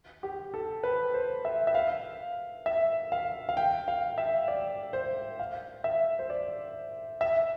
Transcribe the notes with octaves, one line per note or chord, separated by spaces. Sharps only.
G4
A4
B4
C5
E5
E5
F5
E5
F5
F5
G5
F5
E5
D5
C5
F5
E5
C5
D5
E5